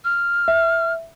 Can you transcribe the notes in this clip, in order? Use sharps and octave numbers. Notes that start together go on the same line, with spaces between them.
F6
E5